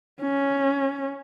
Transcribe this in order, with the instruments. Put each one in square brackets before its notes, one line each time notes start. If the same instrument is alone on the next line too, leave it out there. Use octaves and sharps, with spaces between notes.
[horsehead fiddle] C#4